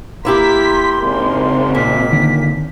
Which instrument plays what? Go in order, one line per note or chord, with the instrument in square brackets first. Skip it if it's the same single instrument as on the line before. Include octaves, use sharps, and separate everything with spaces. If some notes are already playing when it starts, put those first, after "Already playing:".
[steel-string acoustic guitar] A#3 E4 G4 [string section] A#5 B6 [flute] C6
[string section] G#1 C#3
[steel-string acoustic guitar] A#2 [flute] B6
[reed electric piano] D3 D#3 A#3